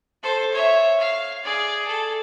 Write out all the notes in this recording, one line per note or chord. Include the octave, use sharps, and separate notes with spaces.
A4 C5
C#5 E5
F5
G#4 D5
A4